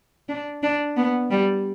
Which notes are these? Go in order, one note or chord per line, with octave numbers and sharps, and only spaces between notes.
D4
D4
B3
G3